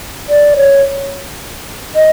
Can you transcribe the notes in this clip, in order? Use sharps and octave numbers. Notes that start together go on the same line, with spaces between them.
D5
C#5
D#5